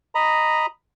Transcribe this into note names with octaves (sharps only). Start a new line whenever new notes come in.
D#5 A#5 B5